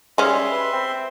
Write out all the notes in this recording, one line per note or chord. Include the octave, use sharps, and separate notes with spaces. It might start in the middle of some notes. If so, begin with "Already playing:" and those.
G3 G#3 C#4 E5 C6
B4
C4